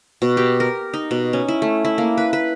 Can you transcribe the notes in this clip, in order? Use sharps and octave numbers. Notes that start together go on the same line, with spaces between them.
B2
G4
A#4
D#4
B2
C#4
E4
A3
E4
A#3
B4
B4